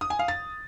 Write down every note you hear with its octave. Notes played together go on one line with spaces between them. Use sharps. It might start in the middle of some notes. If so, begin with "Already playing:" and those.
D#6
G#5
F5
A6